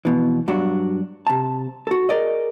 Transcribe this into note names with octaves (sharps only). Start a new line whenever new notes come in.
F2 B2 E3
G2 F#3 D4 F#4
C3 A5
F#4 A4
G#4 A#4 D5 D#5